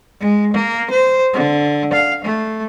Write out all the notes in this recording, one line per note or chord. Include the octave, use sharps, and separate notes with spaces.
G#3
A#3
C5
D3
F5
A3